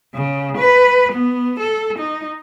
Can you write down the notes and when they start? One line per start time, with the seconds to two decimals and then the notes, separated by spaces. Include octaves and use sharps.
0.15 C#3
0.58 B4
1.13 B3
1.60 A4
1.99 D#4